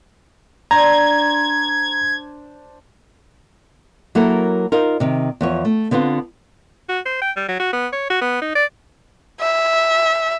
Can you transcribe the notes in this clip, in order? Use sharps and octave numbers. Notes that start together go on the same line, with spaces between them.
D4 C5 A#5 G#6
F#3 A#3 E4 A4 A#4
D#4 F4 A#4
C3 D#3
E2 F3 C#5
A3
D3 B3 C4 F4
F#4
C5
G5
G3
F#3
F#4
B3
C#5
F#4
B3
D#4
D5
E5